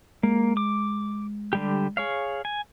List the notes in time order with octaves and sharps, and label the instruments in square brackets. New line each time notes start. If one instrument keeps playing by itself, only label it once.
[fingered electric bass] G#3 [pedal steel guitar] A#3
[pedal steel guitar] D6
D3 G3 G4
G#4 C#5 F5
G#5